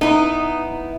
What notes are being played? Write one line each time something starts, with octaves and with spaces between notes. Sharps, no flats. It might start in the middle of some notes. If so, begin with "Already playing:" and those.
B3 D#4 E4